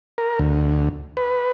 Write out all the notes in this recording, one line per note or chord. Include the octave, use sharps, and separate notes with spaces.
A#4
D2
B4